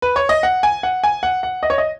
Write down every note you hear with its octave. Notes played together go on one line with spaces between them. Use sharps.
B4
C#5
D#5
F#5
G#5
F#5
G#5
F#5
F#5
D#5
C#5
D#5